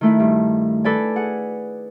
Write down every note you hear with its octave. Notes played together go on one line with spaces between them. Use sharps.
D#3 A3 E4
G2
A4 B4 D5 G#5
G#4 F#5